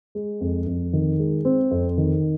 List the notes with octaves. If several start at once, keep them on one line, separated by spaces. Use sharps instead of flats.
G#3
F2
F2
D#3
G#3
C4
F2
D#3